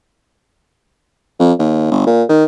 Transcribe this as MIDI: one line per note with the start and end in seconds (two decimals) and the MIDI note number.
1.40 1.52 41
1.59 1.89 39
1.91 2.02 31
2.06 2.23 46
2.29 2.44 51